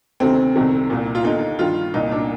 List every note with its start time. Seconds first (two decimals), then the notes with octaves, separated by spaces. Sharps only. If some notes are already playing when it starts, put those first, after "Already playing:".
0.20 D2 C3 D#3 C4
0.56 C2 C3 D#3
0.90 C2 A#2
1.15 F4
1.24 D#2 D3 D#4
1.59 G2 D#3 F4
1.94 C2 A#2 D#4
2.11 D4